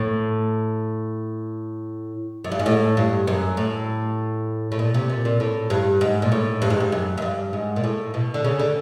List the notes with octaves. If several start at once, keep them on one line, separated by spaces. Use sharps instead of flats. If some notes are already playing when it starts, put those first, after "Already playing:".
Already playing: A2
F#2
G2
G#2
A2
G2
F#2
A2
A2
A#2
C3
A#2
A#2
A2
G2
G#2
A#2
A2
G2
G#2
G2
F#2
F#2
G2
G#2
A#2
A2
B2
D3
C#3
D3